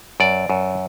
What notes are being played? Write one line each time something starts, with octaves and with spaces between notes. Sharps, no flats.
F#2 D5
F#2